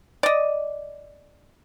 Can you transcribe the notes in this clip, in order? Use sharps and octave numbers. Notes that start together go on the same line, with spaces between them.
D5 D#5